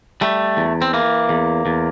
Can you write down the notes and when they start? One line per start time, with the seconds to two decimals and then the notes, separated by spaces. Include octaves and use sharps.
0.21 G3 A3
0.57 E2
0.82 C4
0.93 E3 A#3
1.29 E2
1.66 E2